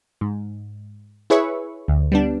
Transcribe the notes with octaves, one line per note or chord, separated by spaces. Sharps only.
G#2
E4 G#4 B4 C#5 E5 C#6
D2
G3 B3 D4